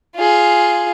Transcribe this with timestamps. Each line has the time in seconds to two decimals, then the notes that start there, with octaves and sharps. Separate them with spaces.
0.16 F4 G#4